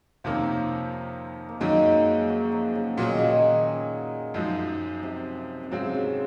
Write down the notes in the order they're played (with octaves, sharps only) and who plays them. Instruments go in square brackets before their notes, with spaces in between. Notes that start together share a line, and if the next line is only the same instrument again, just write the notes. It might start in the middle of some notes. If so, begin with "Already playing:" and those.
[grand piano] F2 C3 D#3 A#3 C#4 [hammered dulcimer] F3
[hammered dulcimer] A#3
[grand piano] F#2 D#3 F#3 C#4 [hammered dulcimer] G#3
[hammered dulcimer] F#3
F3
C#3
[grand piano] A#2 F#3 C#4 G#4 [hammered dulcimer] F3
[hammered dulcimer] D#3
C#3
D#3
[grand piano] F#2 F3 G#3 D#4
[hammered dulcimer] C3
C3
[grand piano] G#2 F#3 C4 F4 [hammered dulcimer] C#3
[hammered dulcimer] C3
C#3